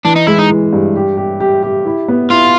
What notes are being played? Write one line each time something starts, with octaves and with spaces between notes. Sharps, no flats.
E3 D4
D#4
G#3 E4
D#4
E3
G2
G4
G4
G4
G4
E4
B3
E4 F4